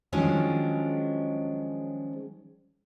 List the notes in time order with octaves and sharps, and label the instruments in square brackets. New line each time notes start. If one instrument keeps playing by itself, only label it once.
[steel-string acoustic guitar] D#3 F3 F#3 G#3 C#4 D4